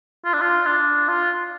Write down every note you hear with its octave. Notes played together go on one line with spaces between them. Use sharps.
F4
D4
F4
D4
F4